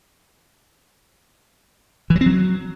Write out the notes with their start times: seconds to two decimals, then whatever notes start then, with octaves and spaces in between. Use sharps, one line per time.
2.10 E3
2.16 F#3
2.21 C4
2.26 F#3